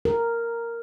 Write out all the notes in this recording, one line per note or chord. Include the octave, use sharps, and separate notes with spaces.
A#4